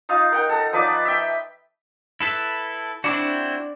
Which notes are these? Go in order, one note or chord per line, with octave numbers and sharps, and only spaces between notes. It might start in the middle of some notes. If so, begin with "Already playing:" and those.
D#4 F4 F5
A#4 F#5 G5
A4 A#5
F3 D#4 B4 D5
E5 G5
E4 A4 B4
C4 D4 E4 F#4